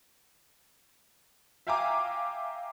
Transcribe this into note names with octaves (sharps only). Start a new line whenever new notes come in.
E5 F5 G5 G#5 A#5 D6